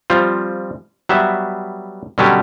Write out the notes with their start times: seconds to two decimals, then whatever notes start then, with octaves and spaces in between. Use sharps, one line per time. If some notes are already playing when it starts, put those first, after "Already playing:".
0.10 F3 G3 C4 F4
1.09 F#3 G3 B3 E5
2.18 B2 D3 F#3 G3 C#4 G4